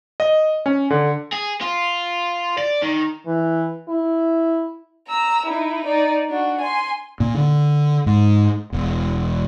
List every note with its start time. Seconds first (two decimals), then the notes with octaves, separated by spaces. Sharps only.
0.20 D#5
0.66 C#4
0.90 D3
1.32 G#4
1.61 F4
2.58 D5
2.82 D#3
3.27 E3
3.89 E4
5.09 A#5 E6
5.46 D#4 E4
5.85 D#4 D5
6.30 D4 F#4
6.61 G#5 C6
7.20 A#2
7.34 D3
8.06 G#2
8.72 E1